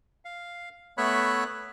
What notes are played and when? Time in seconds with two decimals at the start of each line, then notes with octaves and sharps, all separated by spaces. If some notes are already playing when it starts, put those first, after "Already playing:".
0.25 F5
0.98 A3 B3 C#5 E5 B5 F#6